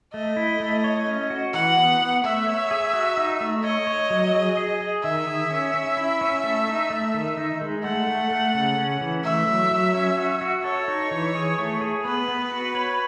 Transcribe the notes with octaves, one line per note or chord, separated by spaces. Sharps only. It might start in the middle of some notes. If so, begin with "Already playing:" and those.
A3 D#5
E4
A3
C#5
C#4
F#4
E3 F#5
B3
B3
A3 E5
C#5
G#4
F#4
D#4
A3
C#5 D#5
C#5
F#3
G#4
G#4
G#4
D#3 E5
G#4
C#4
C#4
E4
C#4
A3
D#4
A3
D#3
D#4
G#3
A3 F#5
A3
A3
C#3
C#4
E3
A3 E5
F#3
F#3
C#4
F#4
F#4
A4 C#5
D#4
E3
G#4
A3
G#4
B3 B4
B3
F#4
C#5